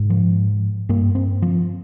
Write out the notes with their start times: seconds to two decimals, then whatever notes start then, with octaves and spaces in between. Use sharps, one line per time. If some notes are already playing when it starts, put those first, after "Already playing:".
Already playing: G#2
0.10 F3
0.89 G2 A#3
1.15 C4
1.42 F3